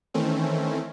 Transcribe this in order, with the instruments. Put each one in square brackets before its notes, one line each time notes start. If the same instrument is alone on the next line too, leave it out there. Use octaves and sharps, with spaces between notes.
[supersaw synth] D#3 E3 A3 C4 C#4